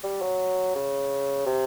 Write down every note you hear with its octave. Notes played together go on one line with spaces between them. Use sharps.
G3
F#3
C#3
C3